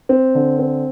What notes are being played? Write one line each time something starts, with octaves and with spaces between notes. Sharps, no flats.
C4
D3
C4